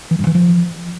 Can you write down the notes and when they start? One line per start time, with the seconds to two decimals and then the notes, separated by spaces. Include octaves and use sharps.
0.11 E3
0.19 G2
0.27 E3
0.35 F3